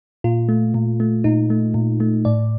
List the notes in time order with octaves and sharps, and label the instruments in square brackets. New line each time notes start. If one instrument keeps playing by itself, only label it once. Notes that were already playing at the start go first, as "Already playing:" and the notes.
[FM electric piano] A#2 F4
A3
A#2
A3
A#2 D#4
A3
A#2
A3
A2 D5